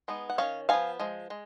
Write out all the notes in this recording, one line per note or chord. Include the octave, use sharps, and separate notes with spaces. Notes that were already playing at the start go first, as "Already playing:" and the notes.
G#3 B3 D#4
F#5
D#3 F#3 C#4 C#5 F5
F3 B3 D#4 F5 G#5
F3 G#3
G#3